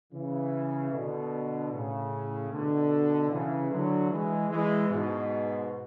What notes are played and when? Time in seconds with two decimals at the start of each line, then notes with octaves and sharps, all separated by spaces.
0.13 C#3 E3
0.92 B2 D3
1.72 A2 C#3
2.51 B2 D3
3.30 C#3 E3
3.70 D3 F#3
4.10 E3 G#3
4.50 E3 G#3
4.89 G#2 B2